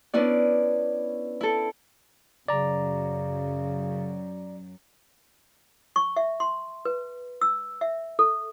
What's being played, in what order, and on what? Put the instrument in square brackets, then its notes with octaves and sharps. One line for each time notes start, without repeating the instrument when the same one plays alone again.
[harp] B3 C#4 D4 E4 D5
E4 A4
[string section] F#2 [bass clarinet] C#3 [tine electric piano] D5 A#5
[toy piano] C#6
E5
C6
B4
E6
E5
A4